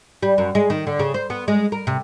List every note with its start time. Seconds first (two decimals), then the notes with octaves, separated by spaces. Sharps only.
0.22 G3
0.38 F#2
0.55 G#3
0.70 D#3
0.87 D3
0.99 C#3
1.14 C5
1.30 B3
1.48 G#3
1.72 A#4
1.87 C3